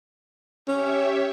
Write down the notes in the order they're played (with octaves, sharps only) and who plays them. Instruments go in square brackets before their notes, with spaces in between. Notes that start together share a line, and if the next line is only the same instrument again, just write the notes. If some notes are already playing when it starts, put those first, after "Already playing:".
[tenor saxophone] C#4 [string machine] G4 C#5 E5